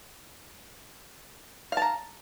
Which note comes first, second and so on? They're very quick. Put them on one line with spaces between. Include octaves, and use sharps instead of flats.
F5 A5 A#5